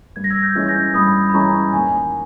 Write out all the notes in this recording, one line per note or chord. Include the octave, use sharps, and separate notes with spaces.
G2 G#6
A#6
E6 G#6
G6 A#6
E3 G#3 C#4
G6 A#6
G2 B5 D#6
B5
E3 G#3 C#4 A#5 C#6
D#2 G#5